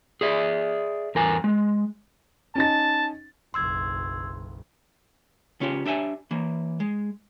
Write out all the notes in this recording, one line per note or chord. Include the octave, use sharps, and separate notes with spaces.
G#4 D5 E5
E2 A#4 G#5
G#3
C#4 D#4 A5 A6
F#1 B1 C6 E6 G#6
C#3 C#4 F4 G4
D4 G4 E5 G5 G#5
E3 A#3
G#3